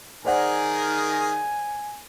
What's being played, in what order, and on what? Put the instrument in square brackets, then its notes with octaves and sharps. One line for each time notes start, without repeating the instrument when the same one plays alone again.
[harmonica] D#3 G#4 [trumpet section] A#4 [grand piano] C5 D5 F#5 [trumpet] G#5